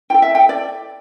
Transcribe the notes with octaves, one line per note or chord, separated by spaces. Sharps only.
E4 A4 G5
E5
G5
D5